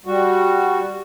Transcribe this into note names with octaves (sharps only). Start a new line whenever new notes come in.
G3 F#4